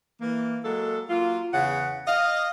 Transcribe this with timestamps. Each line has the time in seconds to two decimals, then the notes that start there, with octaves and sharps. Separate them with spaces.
0.21 E3 A#3
0.65 F#3 G#3 A#3 A4
1.10 F#3 A#3 F4
1.54 E2 C#3 F#5
2.07 D#5 F5